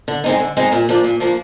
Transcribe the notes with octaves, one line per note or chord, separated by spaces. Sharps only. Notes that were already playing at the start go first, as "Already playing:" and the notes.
D3
G#3 C4 D#4
D3
G#3 C4 D#4
A#2
F3 A#3 D4
A#2
F3 A#3 D4